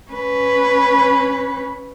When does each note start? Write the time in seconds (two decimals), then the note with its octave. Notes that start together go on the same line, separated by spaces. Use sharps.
0.12 C#4 B4